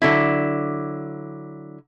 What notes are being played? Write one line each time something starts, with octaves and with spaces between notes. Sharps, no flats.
D3 F#3 E4